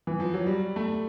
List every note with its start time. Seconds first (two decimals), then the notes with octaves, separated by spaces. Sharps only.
0.07 E3
0.20 F3
0.34 F#3
0.47 G3
0.76 A3